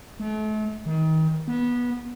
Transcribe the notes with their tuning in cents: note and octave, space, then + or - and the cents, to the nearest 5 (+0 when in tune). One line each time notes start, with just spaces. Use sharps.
A3 -40
D#3 +30
B3 -20